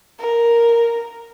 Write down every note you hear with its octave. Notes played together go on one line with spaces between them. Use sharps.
A#4